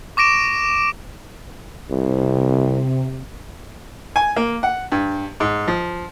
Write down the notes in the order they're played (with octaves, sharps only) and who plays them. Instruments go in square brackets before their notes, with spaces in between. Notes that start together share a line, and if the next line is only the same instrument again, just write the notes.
[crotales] C#6 D6 A#6 D7 E7
[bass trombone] C2 [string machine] C3
[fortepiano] G#5
A#3
F#5
G2
G#2
F3